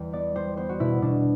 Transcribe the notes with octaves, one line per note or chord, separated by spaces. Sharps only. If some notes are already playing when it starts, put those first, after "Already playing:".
Already playing: E2 G3
B3 D5
G3 C5
B3 C5
F#4
B2 E4
B2 D4